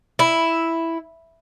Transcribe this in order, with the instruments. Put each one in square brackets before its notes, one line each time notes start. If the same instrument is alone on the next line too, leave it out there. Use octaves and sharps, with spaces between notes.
[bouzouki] E4